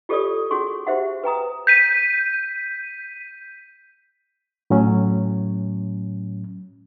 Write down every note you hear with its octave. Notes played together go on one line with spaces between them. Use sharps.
F4 G4 A4 C#5 D5 D#6
C#4 F#4 G#4 C6 C#6
F#4 G4 C5 E5 F#5
B4 G5 A#5 D#6
G6 B6 D#7
A2 F#3 C#4